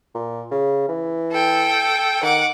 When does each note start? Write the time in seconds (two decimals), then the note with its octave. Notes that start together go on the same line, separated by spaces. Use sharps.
0.15 A#2
0.51 C#3
0.89 E3
1.31 A4 G5
2.23 D#3 F#5 D6